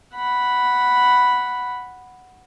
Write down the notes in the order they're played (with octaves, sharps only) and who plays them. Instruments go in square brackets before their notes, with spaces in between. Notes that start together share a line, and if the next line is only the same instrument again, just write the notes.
[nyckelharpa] F#5 B5